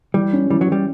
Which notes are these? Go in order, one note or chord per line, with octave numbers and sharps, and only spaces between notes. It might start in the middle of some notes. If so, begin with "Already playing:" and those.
E3 G3
C#4
E3 G3
F#3
E3 G3